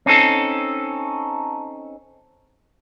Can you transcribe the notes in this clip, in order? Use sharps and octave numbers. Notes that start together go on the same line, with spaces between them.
C4 C#4 D#4 A4